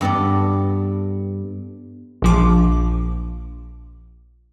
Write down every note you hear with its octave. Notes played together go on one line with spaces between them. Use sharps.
G2 B3 A4 D5
A#1 F3 D6